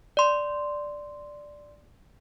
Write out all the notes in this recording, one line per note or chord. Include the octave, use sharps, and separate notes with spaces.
D5 C6